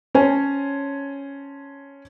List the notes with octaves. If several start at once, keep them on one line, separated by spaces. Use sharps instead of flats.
C#4 C5 C#5 G#5 A5